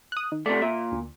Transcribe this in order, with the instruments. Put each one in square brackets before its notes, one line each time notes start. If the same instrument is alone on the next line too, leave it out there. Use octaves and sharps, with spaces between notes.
[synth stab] D#6 F#6
D#3
[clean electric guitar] C3 A3 [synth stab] D5
[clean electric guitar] A#2 [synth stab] E5
[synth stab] D2